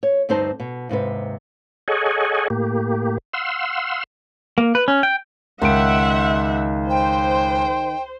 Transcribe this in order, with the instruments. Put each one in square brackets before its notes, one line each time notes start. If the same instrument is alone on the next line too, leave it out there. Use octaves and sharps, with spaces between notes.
[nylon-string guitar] C#5
D2 G2 C4 D#4 C5 A5
B2
D#2 G#2 C3 B4
[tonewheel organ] G#4 A4 C#5 D#5 F#5 G#5
A2 A#3 G4
F5 F#5 C6 E6
[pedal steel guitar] A#3
B4
C#4
G5
[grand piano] C#2 D7 [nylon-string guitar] D#3 [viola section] E5 F#5 [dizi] C6
[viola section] C5 [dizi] G5